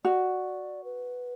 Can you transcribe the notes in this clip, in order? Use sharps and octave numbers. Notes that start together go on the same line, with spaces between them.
F#4 D5
B4